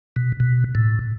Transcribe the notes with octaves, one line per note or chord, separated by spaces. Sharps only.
B2
B2
A2